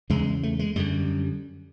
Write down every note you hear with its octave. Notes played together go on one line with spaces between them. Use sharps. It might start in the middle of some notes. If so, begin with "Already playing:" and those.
E2 C#3 G#3
A3
G#3
F#2 D3 G3